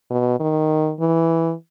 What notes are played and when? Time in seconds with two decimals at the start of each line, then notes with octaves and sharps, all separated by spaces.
0.10 B2
0.40 D#3
1.00 E3